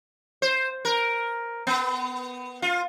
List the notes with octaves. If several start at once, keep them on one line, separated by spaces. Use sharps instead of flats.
C5
A#4
B3
F4